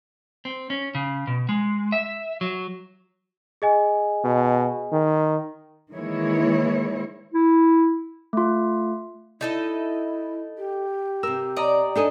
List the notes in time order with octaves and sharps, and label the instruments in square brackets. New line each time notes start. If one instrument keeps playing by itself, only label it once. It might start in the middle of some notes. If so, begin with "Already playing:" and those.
[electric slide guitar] C4
C#4
C#3
B2
G#3
E5
F#3
[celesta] G#4 D#5 G#5
[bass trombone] B2
D#3
[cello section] D#3 E3 G#3 A#3 E4 C#5
[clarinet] E4
[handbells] A3 F4
[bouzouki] D#4 A4 D#5 [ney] E4
[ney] G4
[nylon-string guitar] C3 A#4 [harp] E6
[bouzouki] D5 [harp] D#5 A#5
[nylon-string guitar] D4 A4 G#5 [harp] D#4 D#5